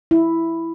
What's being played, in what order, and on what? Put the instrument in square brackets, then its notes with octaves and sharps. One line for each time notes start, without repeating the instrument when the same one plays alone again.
[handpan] E4